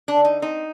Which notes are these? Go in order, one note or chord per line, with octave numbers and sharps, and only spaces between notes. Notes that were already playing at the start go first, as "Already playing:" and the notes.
D4
D3
D#4
C4 D#4